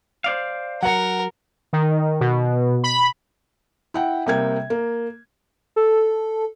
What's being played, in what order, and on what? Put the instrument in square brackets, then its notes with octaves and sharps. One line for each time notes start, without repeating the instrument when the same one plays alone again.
[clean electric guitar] C5 D5 F5
[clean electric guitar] F#3 [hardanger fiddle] A#4 [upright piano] F#5 C#7
[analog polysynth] D#3
B2
B5
[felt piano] E4 F#5 G5
C3 G3 A#3 G5 G#6
A#3
[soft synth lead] A4